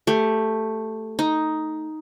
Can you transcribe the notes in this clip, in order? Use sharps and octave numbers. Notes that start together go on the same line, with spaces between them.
A3 G4
D#4